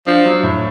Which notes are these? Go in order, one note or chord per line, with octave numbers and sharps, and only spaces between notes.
F3 D4
F#3
A2